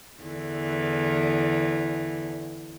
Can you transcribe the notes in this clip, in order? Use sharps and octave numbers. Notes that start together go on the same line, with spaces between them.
E2 D3 E3